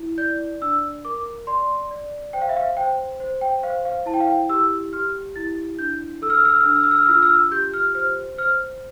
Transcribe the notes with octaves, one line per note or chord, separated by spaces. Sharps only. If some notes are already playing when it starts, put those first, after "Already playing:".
Already playing: E4
D5 G6
D4 E6
A#4 D6
D5 C6
D5
C5 G5
F5
E5
F5
C5 G5
C5
G5
C5 F5
F5
E4 A5
G5
F5
G5
G4 E6
G4 F6
E4 A6
D4 G6
A4 E6
F6
E6
F6
E6
F6
D4 E6
F6
E6
F6
E6
F4 F6
E6
F6
E6
G4 G6
F6
C5 F6
C5 F6